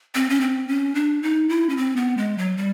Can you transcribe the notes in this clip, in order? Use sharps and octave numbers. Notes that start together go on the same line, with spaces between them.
C4
C#4
C4
C#4
D4
D#4
E4
C#4
C4
B3
G#3
F#3
G3